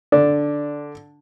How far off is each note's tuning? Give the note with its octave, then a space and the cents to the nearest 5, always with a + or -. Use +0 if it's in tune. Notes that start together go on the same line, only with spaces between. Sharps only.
D3 +0 D4 +0